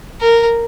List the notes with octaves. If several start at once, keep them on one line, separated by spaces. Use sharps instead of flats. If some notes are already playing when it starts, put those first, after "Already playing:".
A#4